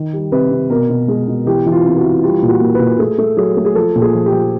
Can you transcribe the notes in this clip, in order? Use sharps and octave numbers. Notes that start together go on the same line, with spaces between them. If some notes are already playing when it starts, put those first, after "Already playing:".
Already playing: D#3
G3
C3 B4
C3
B2 A#4
B2
G#3 G#4
B2
E3 G4
E3
F4
C3
F#4
E3
G3 F4
A#2
F#4
A#3
B4
A#2
A3 G#4
A3
F#3 G#4
A3
G#4
F3 A4
A#2
G#4
F3
G4
F3